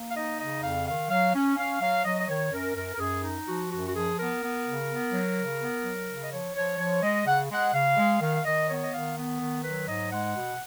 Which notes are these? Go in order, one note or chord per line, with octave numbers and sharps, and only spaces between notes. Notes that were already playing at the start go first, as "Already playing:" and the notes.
Already playing: A#3
F5
D#4 D#5
C#3 D#5
F2 F5
D#3 F5
F#3 F5
C#4
C#4 F5
F#3 F5
F#3 D#5
D#5
D#3 C#5
F#2 A#4
F#2 A#4
A#4
F#2 G#4
D#4
F3 F#4
F#2 F#4
F#4
F3 G#4
B3 A#4
B3
C#3
B3
F#3
C#3
B3
F#3
C#3
D#5
F3 C#5
F3 C#5
F3 C#5
G#3 D#5
C#3 F#5
G#3 F#5
C#3 F5
G#3
D#3 F5
F5
D#3 D#5
B3 C#5
D#5
D#3 F5
B3
D#3
F#3 B4
G#2 D#5
G#3 F#5
B2